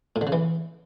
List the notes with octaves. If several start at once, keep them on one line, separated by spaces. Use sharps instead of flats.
A2
D3
C#3
E3